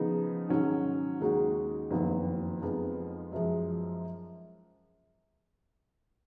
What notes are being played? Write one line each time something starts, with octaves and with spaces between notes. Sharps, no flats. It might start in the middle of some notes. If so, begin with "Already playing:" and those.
Already playing: C#3 F3 B3 D#4
G#2 D#3 F#3 C#4
D#2 C#3 G#3 D#4 F#4
F#1 F2 D#3 F#3 B3
F2 F3 G#3 B3 D#4
F#2 F3 G#3